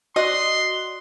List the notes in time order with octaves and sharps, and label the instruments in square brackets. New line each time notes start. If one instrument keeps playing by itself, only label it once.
[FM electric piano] F#4 D5 F#6 [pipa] D#5 [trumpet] C6